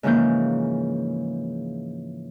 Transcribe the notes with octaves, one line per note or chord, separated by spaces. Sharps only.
G#2 C#3 E3 F3 A#3 G6